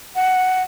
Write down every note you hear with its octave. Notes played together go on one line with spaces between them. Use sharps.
F#5